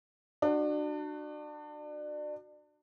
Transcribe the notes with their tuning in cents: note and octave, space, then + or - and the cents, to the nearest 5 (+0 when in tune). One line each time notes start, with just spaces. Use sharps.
D4 +30 F#4 +0